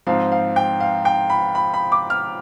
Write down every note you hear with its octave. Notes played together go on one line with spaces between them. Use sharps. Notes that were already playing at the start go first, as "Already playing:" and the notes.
G#2 F3 C4 F5
F5
G5
F5
G5
B5
B5
B5
D6
F6